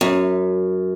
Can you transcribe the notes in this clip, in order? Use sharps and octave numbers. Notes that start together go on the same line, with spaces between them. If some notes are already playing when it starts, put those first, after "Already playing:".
F#2